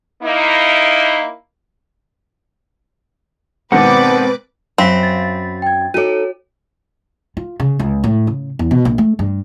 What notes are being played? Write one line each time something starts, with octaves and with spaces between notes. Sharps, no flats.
A#3 D#4 E4
G#2 B2 D#3 C4 B4 D5 F#5 D6
F#2 C4 F5 B5 A#6 B6
A6
G5 G#6
D#4 F#4 A4 C#5 D#7
F4
C#3
C#2
A2
C#3
E2
B2
A#1
A3
G2